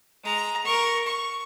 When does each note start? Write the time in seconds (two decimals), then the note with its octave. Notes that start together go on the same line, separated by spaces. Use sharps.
0.24 G#3 A#5
0.65 A#4 C#6
1.06 C#6